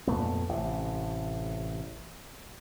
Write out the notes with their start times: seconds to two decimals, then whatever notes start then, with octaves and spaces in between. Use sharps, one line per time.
0.07 F2 A#2 A3 B3
0.49 A1 A2 C3